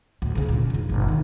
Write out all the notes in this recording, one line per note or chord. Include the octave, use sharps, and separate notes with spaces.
D2 A2
D2 C#3
A#2 C#3
E1 G#2
G1
G#2 D#3